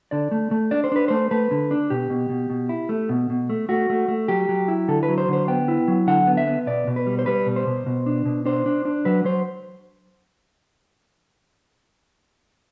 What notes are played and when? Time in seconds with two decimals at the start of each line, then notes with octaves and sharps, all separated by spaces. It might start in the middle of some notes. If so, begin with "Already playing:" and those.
0.11 D3 D5
0.31 A3
0.51 A3
0.71 D4 D5
0.84 C5
0.92 D4 B4
1.08 A3 C5
1.31 A3 B4
1.51 D3
1.71 D4
1.90 B2 G4
2.10 B2
2.30 B2
2.50 B2
2.69 E4
2.89 A3
3.09 B2
3.30 B2
3.49 A3
3.69 A3 F#4
3.90 A3
4.08 A3
4.28 F#3 G4
4.49 F#3
4.68 E4
4.88 D3 A4
5.03 B4
5.08 F#3
5.18 C5
5.28 D3 C5
5.48 B3 G5
5.68 E4
5.88 F#3
6.07 D3 F#5
6.27 B3
6.37 E5
6.47 B3
6.67 B2 D5
6.87 B2
6.96 B4
7.07 G3
7.19 C5
7.26 G3 B4
7.46 B2
7.56 C5
7.67 B2
7.86 B2
8.06 D4
8.26 B2
8.46 D4 C5
8.66 D4
8.85 D4
9.05 F#3 B4
9.25 F#3 C5